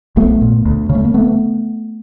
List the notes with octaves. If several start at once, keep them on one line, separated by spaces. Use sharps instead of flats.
A#1 A3 B3
A#2
D2
C#3
A3
A#3
A3 B3